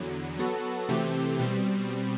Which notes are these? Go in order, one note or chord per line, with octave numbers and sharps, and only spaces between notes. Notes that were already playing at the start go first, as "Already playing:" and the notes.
Already playing: E2 D3 F#3
F#3 B3 F#4 A4
C3 E3 A3 C4 G4
B2 G3 C4